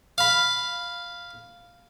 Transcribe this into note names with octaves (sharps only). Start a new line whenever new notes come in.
F5 B5